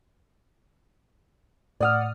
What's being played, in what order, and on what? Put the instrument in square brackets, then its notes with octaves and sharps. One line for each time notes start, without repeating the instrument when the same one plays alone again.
[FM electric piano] A2 D#6 F6 [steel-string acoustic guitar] D5 F#5